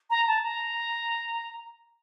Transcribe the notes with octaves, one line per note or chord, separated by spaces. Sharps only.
A#5
A5
A#5